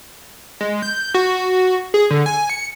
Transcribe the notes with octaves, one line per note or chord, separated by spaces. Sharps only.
G#3
G6
F#4
G#4
D3
G#5
C#7